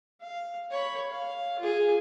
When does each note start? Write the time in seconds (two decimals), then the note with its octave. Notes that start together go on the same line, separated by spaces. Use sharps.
0.21 F5
0.71 C#5 B5
1.10 F5
1.59 F4 G#4